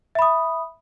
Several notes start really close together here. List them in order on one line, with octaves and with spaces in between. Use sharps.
E5 B5 D#6